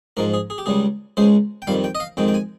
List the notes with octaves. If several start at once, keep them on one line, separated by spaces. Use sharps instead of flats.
G#2 F3 G#3 A#4
G#4
G#4
G4
C#2 C#3 G3 G#4
C#2 C#3 G#3 C5
G5
F2 D#3 G3 F5
G5
D#5
F5
F2 D#3 G#3 G5
G5
G#5